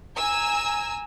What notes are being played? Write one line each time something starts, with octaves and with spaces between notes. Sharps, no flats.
G#5 A#5 E6